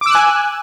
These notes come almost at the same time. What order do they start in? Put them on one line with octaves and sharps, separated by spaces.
D6 E6 F#6 G#5